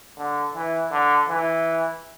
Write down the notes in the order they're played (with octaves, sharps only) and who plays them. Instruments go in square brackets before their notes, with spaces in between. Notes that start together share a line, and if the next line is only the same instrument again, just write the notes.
[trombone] D3
E3
D3
E3